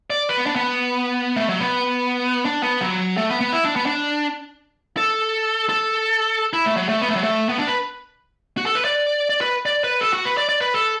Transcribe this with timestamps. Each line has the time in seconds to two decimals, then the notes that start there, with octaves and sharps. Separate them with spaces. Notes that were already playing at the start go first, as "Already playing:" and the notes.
0.10 D5
0.29 B4
0.38 B3
0.46 D4
0.56 B3
1.36 A3
1.49 F#3
1.60 B3
2.45 D4
2.63 B3
2.81 F#3
3.17 A3
3.29 B3
3.41 B3
3.53 E4
3.65 D4
3.76 B3
3.86 D4
4.97 A4
5.69 A4
6.53 E4
6.66 A3
6.77 F#3
6.89 A3
7.02 B3
7.08 A3
7.16 F#3
7.24 A3
7.49 B3
7.58 D4
7.67 B4
8.57 F#4
8.66 A4
8.75 B4
8.85 D5
9.30 D5
9.41 B4
9.66 D5
9.84 B4
10.01 A4
10.13 F#4
10.25 B4
10.37 D5
10.49 D5
10.61 B4
10.74 A4